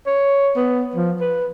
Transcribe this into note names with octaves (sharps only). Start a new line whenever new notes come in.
C#5
B3
F3
B4